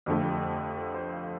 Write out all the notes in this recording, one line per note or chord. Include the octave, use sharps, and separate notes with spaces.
F2 D3 F3 A3 G4
A4
C5
F5